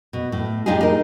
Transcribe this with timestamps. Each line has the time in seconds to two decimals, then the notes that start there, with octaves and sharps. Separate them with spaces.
0.13 B2
0.32 A2
0.66 A2 D4 D#4 F4 G4 G#4
0.81 D#4 A#4